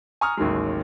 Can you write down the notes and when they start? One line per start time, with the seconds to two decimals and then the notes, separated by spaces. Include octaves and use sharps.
0.21 G#5 A#5 C#6 D#6 F6
0.37 A1 D#2 D#3 F#3 G#3